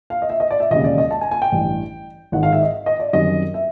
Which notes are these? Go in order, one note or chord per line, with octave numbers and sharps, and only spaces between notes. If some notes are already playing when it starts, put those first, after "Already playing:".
F5
D#5
E5
D#5
D5
E5
E1 D#2 C#3 D#5
D5
D#5
A5
G#5
G#5
G5
A1 G2 E3
G#1 G#2 D#3 F#5
F5
E5
D#5
D#5
D5
F#2 D#3 G3 C4 D#5
E5